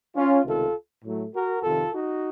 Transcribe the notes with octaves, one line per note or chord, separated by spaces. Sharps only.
C#4 F4
C#2 C3 D#3 A3 F4 A4
A2 F#3 A3
F#4 A#4
F2 C3 D#3 F4 A4
D#4 F#4